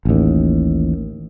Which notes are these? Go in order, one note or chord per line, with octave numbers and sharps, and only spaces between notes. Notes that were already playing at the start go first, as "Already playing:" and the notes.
A1 D#2